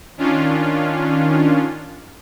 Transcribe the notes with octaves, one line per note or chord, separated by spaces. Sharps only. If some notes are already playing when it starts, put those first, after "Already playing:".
D#3 C#4 D4 F4